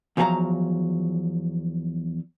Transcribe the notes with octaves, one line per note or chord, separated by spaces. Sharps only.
E2 F3 F#3 G#4 F5 A#5